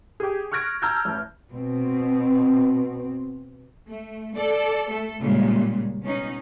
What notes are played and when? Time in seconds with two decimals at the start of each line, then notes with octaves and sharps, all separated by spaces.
0.20 G4 G#4
0.52 C#6 F6 F#6 G#6 A#6 D7
0.82 A5 A#5 E6 F6 G6 G#6
1.05 A1 A5
1.50 B2 C4
3.87 A3
4.36 A4 D5
4.90 A3 A4
5.20 A#2 C#3 G3 G#3
6.03 B2 C#4 D#4